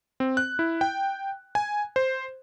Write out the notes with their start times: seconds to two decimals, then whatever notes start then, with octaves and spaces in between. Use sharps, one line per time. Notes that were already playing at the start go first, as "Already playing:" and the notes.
0.20 C4
0.37 F#6
0.59 E4
0.81 G5
1.55 G#5
1.96 C5